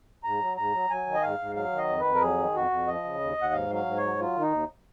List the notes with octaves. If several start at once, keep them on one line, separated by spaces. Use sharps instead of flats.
G#2 A#5
F#3
G#2 A#5
F#3
F#3 G#5
D#3
D#5
G#2 F5
G#2
F#3 F5
D#3
D#5
F2
B4
F2
A#4
F#3 G#4
D#3
F2 F#4
F2
F3 D#5
C#3
D#2
D#2 F#5
G#2 F5
F#3 F5
G#2
C#5
F#3
F#3 F4
D#3
D#4
D#2